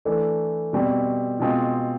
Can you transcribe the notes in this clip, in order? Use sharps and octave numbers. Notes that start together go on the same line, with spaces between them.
E3 A3 D4
B2 G3 C4
B2 G#3 C4 F4